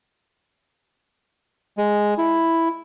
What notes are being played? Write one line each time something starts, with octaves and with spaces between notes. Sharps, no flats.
G#3
E4